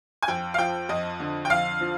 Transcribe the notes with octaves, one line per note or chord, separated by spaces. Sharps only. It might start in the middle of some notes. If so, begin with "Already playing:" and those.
G#5
F2 G5
F5
F3 G5
F2 D#5
D3
G5
F2 F5
F3